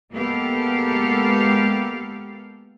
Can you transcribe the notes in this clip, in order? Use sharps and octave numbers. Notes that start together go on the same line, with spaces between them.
G#3 A#3 B3 G4 A4 F5